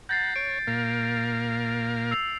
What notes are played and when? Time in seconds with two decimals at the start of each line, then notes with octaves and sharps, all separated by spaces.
0.09 F#5 A#5 G6 A6 C7
0.36 C#5 D7
0.67 A#2 A#4 F5
2.11 E6 C7 F7